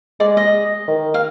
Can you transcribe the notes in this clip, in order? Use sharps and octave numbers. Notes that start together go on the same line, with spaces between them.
G#3 D5
D#5
D#3
F5